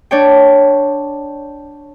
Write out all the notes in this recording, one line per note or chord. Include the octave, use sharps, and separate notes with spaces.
D4 C#5 G5